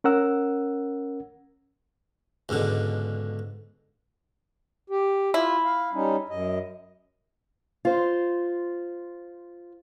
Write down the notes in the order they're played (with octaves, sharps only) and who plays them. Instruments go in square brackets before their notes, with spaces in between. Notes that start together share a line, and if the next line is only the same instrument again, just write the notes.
[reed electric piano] C#4 A#4 F#5 E6
[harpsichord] C#2 G#2 B2 D3
[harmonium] G4
[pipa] E4 [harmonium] F4
[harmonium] F5
G3 C#4 D#4
F#2 D#5
[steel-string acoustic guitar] F4 C5